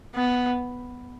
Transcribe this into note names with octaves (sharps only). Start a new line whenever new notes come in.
B3